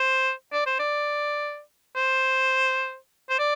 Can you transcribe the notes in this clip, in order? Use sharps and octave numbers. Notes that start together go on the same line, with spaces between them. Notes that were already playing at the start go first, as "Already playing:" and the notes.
Already playing: C5
D5
C5
D5
C5
C5
D5